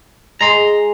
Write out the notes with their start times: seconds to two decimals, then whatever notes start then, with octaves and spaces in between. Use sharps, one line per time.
0.41 G#3 A#5 C6